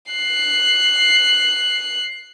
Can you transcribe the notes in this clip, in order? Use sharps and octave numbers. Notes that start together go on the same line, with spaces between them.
F#6 C7